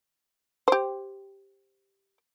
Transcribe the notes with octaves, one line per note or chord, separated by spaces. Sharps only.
G4 C5